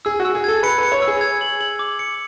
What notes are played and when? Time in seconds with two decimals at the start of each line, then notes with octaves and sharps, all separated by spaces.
0.05 G#4 E6
0.20 F#4
0.25 E6
0.35 G#4
0.44 A4 G#6
0.63 B4 C#7
0.79 B4 C#7
0.92 C#5
1.02 E6
1.08 G#4
1.21 G#6
1.41 F#7
1.61 F#7
1.79 D6
1.99 C#7